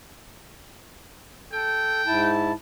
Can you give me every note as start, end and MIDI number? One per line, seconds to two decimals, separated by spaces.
1.52 2.01 69
1.52 2.36 79
2.06 2.52 44
2.06 2.52 64
2.06 2.52 81